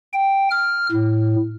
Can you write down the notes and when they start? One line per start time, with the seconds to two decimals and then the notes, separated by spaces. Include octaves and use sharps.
0.13 G5
0.50 F6
0.92 A2